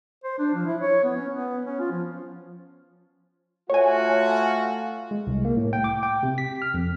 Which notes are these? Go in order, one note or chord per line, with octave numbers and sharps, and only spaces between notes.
C5
D4
F3
E4
C#5
B3
C#4
B3
C#4
F4
F3
A3 F4 F#4 C#5 G#5
G#3
C2
A#3
A2
G5
D6
G5
C3
B6
F6
F2